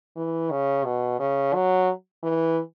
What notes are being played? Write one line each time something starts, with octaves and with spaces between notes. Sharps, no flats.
E3
C#3
B2
C#3
F#3
E3